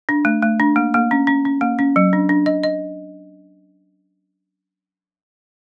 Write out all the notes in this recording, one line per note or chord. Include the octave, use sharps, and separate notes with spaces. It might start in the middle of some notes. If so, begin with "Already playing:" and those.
D4
A3
A3
D4
A#3
A#3
C#4
C#4
C#4
A#3
C#4
F#3
D4
D4
D#5
D#5